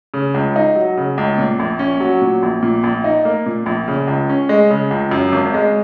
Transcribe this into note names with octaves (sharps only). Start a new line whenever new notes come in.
C#3
C#2
D#4
F#3
C#3
C#2
A#2
A#1
C#4
F#3
A#2
A#1
A#2
A#1
D#4
A#3
A#2
A#1
C#3
C#2
C#4
G#3
C#3
C#2
F#2
G#1
G#3